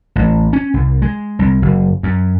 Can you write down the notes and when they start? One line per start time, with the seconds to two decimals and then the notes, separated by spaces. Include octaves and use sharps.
0.16 A1
0.53 C#4
0.74 C2
1.02 G#3
1.39 C2
1.62 F#1
2.03 F#2